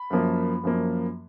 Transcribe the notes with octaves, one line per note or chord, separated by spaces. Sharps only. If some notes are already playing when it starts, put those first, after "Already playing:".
Already playing: B5
F#2 F3 A#3
F#2 F3 A#3